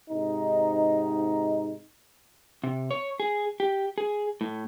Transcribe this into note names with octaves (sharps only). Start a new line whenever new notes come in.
G#2 C3 D#4
C3
C#5
G#4
G4
G#4
A2